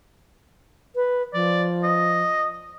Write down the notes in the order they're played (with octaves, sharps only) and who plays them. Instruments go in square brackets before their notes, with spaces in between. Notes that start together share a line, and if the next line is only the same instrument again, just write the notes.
[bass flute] B4
[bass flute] F3 [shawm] D5
[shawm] D#5